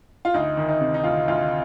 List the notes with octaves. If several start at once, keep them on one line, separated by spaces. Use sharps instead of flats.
F4
D2 D#4
D#3
D#4
C3
D#4
D2 F4
D2 F4